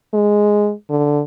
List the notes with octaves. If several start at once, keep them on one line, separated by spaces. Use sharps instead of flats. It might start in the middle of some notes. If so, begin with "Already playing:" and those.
G#3
D3